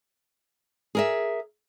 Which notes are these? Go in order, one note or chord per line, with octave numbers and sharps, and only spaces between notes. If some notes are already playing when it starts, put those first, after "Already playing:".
G#4 A#4 E5